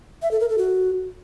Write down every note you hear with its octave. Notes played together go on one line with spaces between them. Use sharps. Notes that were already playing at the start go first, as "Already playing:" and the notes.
E5
A4
A#4
A4
F#4